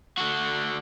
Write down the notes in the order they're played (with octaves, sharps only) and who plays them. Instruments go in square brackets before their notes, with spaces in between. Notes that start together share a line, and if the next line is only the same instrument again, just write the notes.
[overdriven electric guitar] D3 F#4